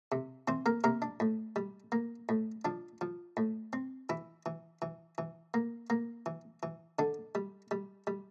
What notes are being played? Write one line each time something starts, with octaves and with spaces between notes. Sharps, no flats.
C3
E3 C4 C5
A#3 A#4
C3 A#3 A#4
D4
A2
G3
A#3
A2
F3 D4
F3
A2
C4
E3 E4
E3
E3
E3
A#3
A#3
E3
E3
D3 D4
G3
G3
G3